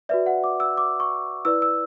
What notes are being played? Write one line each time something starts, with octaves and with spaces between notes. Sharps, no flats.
F#4 B4 D5 E5
F#5
D6
E6
D6
C#6
E4 B4 D5 E6
E6